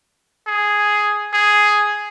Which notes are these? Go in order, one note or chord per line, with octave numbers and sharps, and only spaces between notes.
G#4
G#4